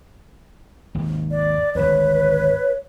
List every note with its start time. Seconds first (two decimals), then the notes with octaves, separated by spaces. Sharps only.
0.95 G#1 D#2
1.31 D5
1.75 G#1 D2 B4 C#5